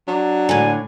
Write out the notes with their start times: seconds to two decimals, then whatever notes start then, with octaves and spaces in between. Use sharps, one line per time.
0.08 F#3 D4
0.49 A2 D3 G#5